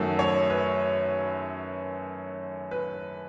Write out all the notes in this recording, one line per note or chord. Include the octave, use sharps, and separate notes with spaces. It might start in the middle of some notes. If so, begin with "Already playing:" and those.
Already playing: F#2 D#3 F#3 A3
C#5
B4
B4